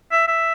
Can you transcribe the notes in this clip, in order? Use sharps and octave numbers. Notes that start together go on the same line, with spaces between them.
E5
E5